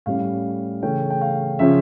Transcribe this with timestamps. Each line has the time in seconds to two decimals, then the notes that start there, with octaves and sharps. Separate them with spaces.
0.06 A2 G3 C#4 F5
0.83 C#3 E3 A3 C#4 G5
1.10 G5
1.21 F5
1.59 C#3 F3 C#4 E5